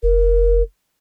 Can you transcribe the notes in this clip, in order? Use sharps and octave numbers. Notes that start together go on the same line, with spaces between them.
F1 A#4